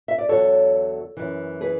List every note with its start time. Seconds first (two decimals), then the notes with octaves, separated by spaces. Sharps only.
0.08 E5
0.18 D5
0.29 E2 D3 F#3 A4 C#5
1.17 F#2 E3
1.61 G#4 B4